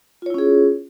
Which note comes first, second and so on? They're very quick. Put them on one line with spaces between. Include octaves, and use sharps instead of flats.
F4 C#5 E4 C#4 G#4